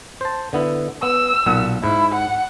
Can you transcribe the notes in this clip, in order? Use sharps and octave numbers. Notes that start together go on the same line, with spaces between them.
C5 A5
D3 B3 E4
B3 E6
B1 A#2 F#5
G#2 E4
F#5